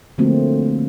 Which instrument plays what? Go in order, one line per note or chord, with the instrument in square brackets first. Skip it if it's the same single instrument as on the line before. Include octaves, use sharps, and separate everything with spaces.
[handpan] D3 F3 F#3 A3 A#3 C4